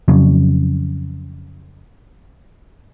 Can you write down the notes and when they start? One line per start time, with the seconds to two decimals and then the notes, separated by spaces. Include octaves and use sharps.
0.08 F2 C#3 F#3